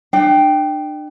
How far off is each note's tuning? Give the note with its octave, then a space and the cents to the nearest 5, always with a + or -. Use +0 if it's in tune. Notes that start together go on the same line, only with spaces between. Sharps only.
D4 +40 G5 +0